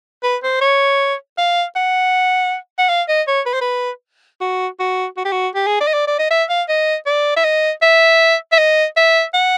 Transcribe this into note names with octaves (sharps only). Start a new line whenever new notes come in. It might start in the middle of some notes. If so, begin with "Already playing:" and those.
B4
C5
C#5
F5
F#5
F#5
F5
D#5
C#5
B4
C5
B4
F#4
F#4
F#4
G4
F#4
G4
G#4
D5
D#5
D5
D5
D#5
E5
F5
D#5
D5
E5
D#5
E5
E5
D#5
E5
F#5